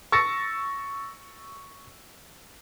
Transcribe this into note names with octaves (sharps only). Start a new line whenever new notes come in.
C#6 E6 A6 A#6 C#7